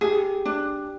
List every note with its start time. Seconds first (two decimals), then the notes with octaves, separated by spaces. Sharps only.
0.01 G4 G#4
0.45 D4